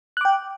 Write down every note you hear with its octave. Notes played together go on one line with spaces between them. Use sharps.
G5 D6 F#6